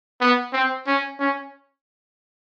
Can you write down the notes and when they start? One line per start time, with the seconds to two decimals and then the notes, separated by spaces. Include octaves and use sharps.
0.21 B3
0.53 C4
0.87 C#4
1.20 C#4